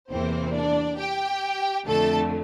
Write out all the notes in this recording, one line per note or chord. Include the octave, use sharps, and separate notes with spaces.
E2 C3 E3 A#3 C4 C5
D4 D5
G4 G5
F2 D3 A3 A4 A5